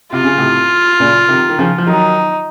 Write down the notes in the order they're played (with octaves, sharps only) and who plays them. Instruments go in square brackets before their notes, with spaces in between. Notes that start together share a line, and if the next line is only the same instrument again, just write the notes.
[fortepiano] C3 [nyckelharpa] F4
[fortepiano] C#3
A2 C3
A#2 C#3
C3 D#3
D#3
C#3 F3
F3
[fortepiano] D#3 F#3 [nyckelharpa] D#4